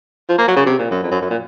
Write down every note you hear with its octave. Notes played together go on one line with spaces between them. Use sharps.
F3
A#3
F#3
C#3
C3
A#2
F#2
F2
F#2
F#2
A#2